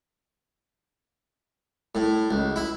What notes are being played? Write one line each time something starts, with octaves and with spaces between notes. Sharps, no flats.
A2
C#2
E4